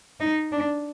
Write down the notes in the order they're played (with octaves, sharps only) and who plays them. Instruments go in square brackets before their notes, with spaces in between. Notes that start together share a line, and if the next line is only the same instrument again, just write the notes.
[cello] D#4
D4